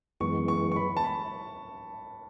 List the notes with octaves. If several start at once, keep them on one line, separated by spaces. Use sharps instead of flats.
F#2 E3 G#3 B3 C#6
C#6
C#6
B5
A5
B5